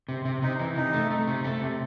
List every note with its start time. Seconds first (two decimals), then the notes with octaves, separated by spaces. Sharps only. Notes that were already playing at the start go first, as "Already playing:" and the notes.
0.09 C3
0.25 C3
0.42 C3 D#4
0.59 E3
0.76 C3 D#4
0.93 A3
1.10 A3
1.27 C3
1.44 A3
1.61 C3